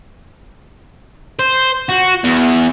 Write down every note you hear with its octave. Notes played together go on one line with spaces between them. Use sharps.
C5
F#4
E2